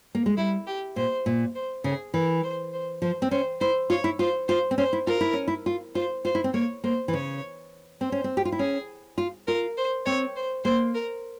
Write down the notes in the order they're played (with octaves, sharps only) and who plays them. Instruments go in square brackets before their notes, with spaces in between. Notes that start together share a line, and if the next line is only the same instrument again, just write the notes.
[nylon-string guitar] A#3
G#3
[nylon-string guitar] G3 [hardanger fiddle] E4
[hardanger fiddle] G4
[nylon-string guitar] A#2 [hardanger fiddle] C5
[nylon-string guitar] A#2
[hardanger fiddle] C5
[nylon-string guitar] C#3 [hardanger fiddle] G#4
[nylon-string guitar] E3 [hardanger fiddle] A#4
[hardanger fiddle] C5
C5
[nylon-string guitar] F3 [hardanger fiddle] C5
[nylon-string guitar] C4
[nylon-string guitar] C#4 [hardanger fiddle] C5
[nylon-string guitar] E4 [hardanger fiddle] C5
[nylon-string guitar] F4 [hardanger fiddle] C#5
[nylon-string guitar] E4
[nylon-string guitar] F4 [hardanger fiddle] C5
[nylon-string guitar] F4 [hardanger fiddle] C5
[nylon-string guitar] C4
[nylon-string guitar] C#4 [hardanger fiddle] C5
[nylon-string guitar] E4
[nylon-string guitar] F4 [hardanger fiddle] A#4
[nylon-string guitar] E4
C#4
E4
F4
[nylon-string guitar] F4 [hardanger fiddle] C5
[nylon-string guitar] F4 [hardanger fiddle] C5
[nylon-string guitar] E4
C4
[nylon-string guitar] A#3 [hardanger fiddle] C#5
[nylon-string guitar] A#3 [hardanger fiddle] C5
[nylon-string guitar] E3
[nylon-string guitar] C#3 [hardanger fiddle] C#5
[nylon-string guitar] C4 [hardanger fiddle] C5
[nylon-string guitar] C#4
C4
G4
F4
E4
[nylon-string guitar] C#4 [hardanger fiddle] G#4
[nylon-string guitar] F4
[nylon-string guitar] F4 [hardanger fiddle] A#4
[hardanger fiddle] C5
[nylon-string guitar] C4 [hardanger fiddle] C#5
[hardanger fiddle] C5
[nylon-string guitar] A#3 [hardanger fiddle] C5
[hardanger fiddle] A#4